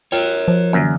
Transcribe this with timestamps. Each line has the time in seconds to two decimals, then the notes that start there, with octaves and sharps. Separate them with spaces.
0.12 F4 A#4 C#5 G5
0.48 F3
0.73 F#2 D3 E3 A#3